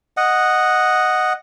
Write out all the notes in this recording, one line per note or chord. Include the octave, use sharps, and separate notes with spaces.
D#5 F#5